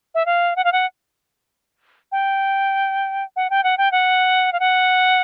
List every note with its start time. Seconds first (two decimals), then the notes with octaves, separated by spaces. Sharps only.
0.15 E5
0.26 F5
0.56 F#5
0.64 F5
0.72 F#5
2.12 G5
3.36 F#5
3.50 G5
3.64 F#5
3.78 G5
3.92 F#5
4.53 F5
4.60 F#5